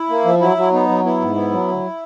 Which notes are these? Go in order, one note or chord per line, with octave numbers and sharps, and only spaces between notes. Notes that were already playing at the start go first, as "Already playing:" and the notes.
Already playing: E4
A#3
F3
F#3 E4
F#3
B3 D#4
F#3
B3 E4
G#2
B3
F#3
D2